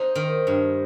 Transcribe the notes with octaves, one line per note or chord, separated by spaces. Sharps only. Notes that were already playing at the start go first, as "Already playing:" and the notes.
Already playing: D#4 C5
D#3
G2